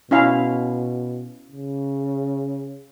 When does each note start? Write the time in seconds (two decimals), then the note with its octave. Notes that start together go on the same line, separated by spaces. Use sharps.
0.11 B2 C#4 E4 F5
1.51 C#3